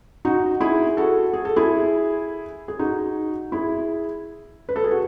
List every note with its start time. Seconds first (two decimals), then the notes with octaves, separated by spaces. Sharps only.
0.25 D#4 F#4
0.61 E4 G#4
0.97 F#4 A4
1.33 G#4
1.45 A4
1.56 E4 G#4
2.68 G#4
2.79 D#4 F#4
3.52 E4 G#4
4.69 B4
4.76 A4
4.84 G#4
4.91 F#4